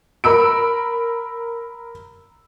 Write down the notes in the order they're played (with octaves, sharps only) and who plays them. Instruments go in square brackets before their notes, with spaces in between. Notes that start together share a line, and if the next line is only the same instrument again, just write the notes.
[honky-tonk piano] A#4 B5 E6 D7